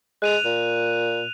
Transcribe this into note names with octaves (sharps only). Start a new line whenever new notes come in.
G#3 F#6 D#7 F7
A#2